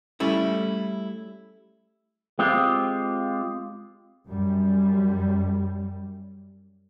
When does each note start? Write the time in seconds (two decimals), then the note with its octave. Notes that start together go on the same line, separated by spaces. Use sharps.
0.20 G3 A3 C#4 E4
2.39 G#3 C4 F4 G4
4.27 F#2 G3